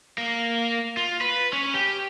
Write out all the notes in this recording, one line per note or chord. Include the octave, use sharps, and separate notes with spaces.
A#3
F4
B4
C#4
G4